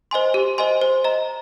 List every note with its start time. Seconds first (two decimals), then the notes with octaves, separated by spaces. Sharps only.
0.11 C5 D#5 G#5 C6
0.34 G4
0.58 C5 D#5 G#5 C6
0.81 C5
1.04 D#5 A#5